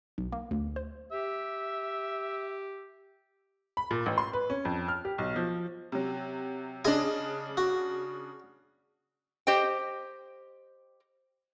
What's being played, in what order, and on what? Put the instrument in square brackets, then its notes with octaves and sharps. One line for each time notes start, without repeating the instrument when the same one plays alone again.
[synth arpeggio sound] B1
A#3
D2
C5
[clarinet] G4 [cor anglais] E5
[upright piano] B5
A#2
A1
C6
B4
C#4
F2
F6
G4
B1
F3
[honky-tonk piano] C3 F#3
[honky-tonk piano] C#3 D4 [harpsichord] G#4 D#5 G#5
[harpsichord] F#4
[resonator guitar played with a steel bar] G4 C5 D#5 G5